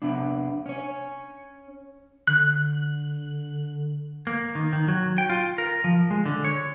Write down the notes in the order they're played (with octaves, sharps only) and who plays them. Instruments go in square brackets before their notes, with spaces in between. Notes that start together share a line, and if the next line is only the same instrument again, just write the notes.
[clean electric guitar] C3 B3 D4
C#4 C#5
[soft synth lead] D3 [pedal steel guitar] F#6
[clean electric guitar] A#3
D#3
D#3
F#3
G5
F4
A#4
F3
G#3
D3
C#5